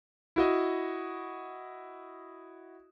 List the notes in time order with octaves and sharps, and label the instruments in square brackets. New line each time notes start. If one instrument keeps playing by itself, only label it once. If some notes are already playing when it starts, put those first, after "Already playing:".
[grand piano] E4 F#4 D#5